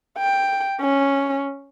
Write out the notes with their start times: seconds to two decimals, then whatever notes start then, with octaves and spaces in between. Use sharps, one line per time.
0.18 G5
0.81 C#4